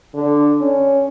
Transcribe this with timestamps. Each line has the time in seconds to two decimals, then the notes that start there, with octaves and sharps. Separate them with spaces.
0.14 D3
0.61 C#4